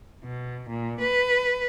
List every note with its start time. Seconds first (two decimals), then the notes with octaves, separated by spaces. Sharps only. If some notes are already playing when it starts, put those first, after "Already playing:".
0.24 B2
0.69 A#2
1.00 B4